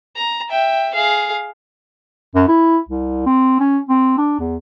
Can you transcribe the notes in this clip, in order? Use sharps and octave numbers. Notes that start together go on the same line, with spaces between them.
A#5
E5 G5
G#4 F5
F#2
E4
C2
C4
C#4
C4
D4
E2